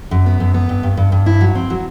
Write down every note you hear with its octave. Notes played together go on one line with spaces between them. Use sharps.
F#2
B3
F#2
B3
G2
G2
G2
G2
E4
F#3
C4
F#3